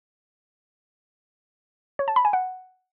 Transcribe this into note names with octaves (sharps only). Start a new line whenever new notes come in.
C#5
A5
B5
G#5
F#5